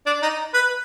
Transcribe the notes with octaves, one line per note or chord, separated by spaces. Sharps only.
D4
D#4
B4